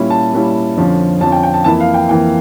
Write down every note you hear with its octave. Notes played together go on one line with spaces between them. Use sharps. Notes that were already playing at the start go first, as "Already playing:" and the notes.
Already playing: A#2 G3 C#4 E4
A5
A#2 G3 C#4 E4
F2 D3 F3 C#4
F2 D3 F3 C#4 A5
G5
G5
A5
F2 E3 A#3 E4 A5
F5
G5
F2 E3 A#3 E4 G5